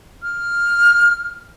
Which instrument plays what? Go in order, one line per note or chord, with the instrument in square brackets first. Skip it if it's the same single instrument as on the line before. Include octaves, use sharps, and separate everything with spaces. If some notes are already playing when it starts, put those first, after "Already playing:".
[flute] F6